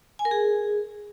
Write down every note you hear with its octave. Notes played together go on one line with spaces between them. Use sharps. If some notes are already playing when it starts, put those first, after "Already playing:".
G#5
A#4
G#4